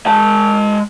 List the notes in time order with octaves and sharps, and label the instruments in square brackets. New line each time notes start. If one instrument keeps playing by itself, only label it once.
[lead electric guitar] G#3 A5